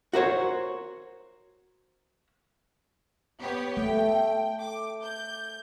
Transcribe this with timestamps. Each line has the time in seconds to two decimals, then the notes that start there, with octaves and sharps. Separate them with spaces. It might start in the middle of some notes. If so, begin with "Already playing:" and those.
0.13 F#4 A#4 C5 C#5
3.40 B3 G4 C#5
3.77 A3 G5
4.62 D6
5.03 G6